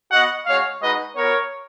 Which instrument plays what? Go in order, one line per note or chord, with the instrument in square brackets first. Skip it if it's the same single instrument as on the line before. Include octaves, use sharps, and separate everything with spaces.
[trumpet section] B3 F#4 D#5 F#5
G#3 C#4 F#4 C#5 F5
G#3 D#4 F#4 B4 D#5
B3 F#4 A#4 C#5